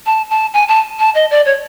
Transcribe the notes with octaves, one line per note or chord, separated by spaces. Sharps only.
A5
A5
G#5
A5
A5
D#5
D5
C#5